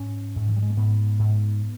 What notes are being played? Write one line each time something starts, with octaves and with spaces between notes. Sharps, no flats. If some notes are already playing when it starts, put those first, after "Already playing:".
Already playing: G#2 C#4
G#2
E3
G3
G#3
A#3
G#2 B3
G#2